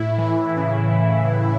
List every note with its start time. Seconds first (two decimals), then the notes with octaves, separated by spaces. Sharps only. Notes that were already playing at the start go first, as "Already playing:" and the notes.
Already playing: A2 E4
0.18 E3
0.57 C#3